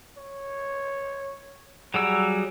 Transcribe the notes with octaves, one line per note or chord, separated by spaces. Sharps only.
C#5
F#3 G3 G#4 E6